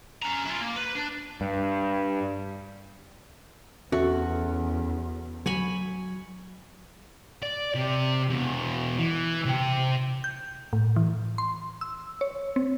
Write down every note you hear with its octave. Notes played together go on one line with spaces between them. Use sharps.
C#4 A#5
E4 F4
A#3
B4
D4
G2
E2 C#4 F#4 A4 E5
F#3 C#5 G#5 B5
D5
C3
E2 B2
E3
C3 G5
G6
A2
E3
C6
E6
C#5
C4